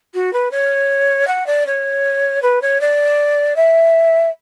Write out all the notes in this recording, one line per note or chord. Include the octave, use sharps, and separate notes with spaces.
F#4
B4
C#5
F#5
D5
C#5
B4
C#5
D5
E5